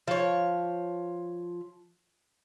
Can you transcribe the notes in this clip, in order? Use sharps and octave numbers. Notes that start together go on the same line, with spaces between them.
F3 C#5